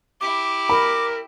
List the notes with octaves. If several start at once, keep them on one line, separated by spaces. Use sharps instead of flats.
E4 G4 D6
A#4 B5